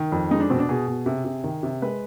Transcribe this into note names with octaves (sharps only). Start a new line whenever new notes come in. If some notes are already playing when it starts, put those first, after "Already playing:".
Already playing: D#3
F2
G#3 D#4
D4
B2 C4
D4
B2 G#4
B2
C3
C3
D#3
C3
G#3 B4